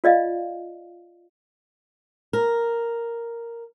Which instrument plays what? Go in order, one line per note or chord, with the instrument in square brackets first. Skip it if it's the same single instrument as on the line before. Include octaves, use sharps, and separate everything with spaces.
[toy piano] F4 D5 D#5 F5
[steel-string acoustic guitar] A#4